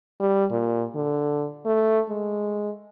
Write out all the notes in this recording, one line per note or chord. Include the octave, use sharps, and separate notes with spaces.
G3
A#2
D3
A3
G#3